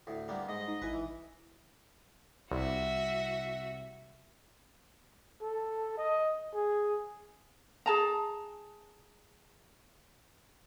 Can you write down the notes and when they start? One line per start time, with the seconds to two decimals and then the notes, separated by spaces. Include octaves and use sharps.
0.07 D2 A2
0.28 D3 G3 A#3 B3
0.49 G#2 D#5
0.68 D#4
0.82 G#1 E4 B4 G#5
0.93 E3
2.51 C2 F#4 E5
5.42 A4
5.98 D#5
6.55 G#4
7.86 G#4 A5 A#5